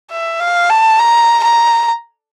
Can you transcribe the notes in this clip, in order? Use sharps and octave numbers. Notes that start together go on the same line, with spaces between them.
E5
F5
A5
A#5
A#5